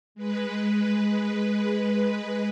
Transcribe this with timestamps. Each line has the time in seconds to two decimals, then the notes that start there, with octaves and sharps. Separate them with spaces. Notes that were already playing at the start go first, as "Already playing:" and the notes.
0.15 G#3 B4